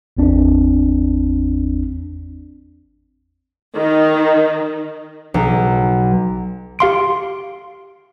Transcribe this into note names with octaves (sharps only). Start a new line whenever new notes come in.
G#1 E2 C4 D4
D#3
B1
G4 F5 C6 D7